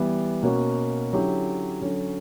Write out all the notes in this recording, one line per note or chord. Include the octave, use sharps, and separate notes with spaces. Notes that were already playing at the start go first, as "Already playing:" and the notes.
Already playing: E3 G3 B3
B2 A#3 C#4 F#4
D3 F#3 C#4 E4 G4
D3 F#3 C#4